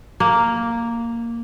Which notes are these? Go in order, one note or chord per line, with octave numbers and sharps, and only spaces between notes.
A#3